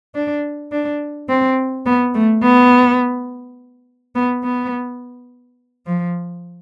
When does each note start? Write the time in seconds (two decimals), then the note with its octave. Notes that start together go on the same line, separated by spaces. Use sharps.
0.15 D4
0.72 D4
1.29 C4
1.86 B3
2.15 A3
2.43 B3
4.15 B3
4.44 B3
5.86 F3